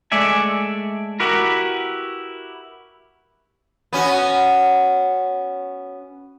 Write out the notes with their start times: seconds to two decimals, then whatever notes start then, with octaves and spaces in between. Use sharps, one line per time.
0.12 G#3 A3 D5 E5 G#5
1.20 E4 F#4 G4 A#4 B4
3.93 B3 C#4 F#4